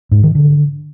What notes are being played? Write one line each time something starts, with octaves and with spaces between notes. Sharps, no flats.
G#2
D#3
D3